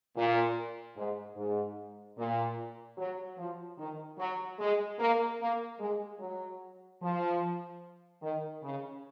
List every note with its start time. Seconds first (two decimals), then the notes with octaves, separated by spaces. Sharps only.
0.16 A#2
0.96 G#2
1.36 G#2
2.17 A#2
2.97 F#3
3.37 F3
3.78 D#3
4.18 F#3
4.59 G#3
4.99 A#3
5.40 A#3
5.79 G#3
6.20 F#3
7.01 F3
8.22 D#3
8.62 C#3